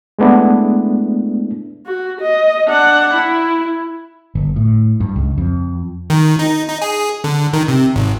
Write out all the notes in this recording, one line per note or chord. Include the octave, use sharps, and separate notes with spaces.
G#3 A3 B3 D4 E4
F#4
D#5
D4 F#5
E4
G1
A2
G2
C#2
F2
D#3
D#4
D#4
G#4
D3
D#3
C3
G#1